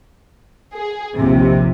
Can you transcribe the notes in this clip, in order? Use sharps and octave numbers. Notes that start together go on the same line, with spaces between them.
G#4
A#1 D#2 C3